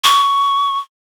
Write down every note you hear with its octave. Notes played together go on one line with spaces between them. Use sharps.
C#6